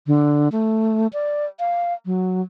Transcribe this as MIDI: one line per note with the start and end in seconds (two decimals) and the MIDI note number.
0.07 0.48 50
0.52 1.07 57
1.13 1.46 74
1.60 1.94 77
2.06 2.42 54